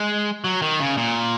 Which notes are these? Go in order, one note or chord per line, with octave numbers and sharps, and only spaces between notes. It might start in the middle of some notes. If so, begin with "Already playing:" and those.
Already playing: G#3
F#3
D#3
C#3
A#2